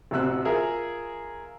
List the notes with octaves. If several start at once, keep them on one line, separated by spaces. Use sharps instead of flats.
A1 D2 C3 E6 F#6
F4 G#4 A#4 E5